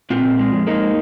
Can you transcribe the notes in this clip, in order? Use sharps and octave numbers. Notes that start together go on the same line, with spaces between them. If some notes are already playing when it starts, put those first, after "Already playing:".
A#2 C4 F4
A#2
G#3
F2
G#3 A#3 D#4